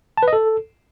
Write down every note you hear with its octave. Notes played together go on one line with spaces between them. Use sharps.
A5
B4
D#5
A4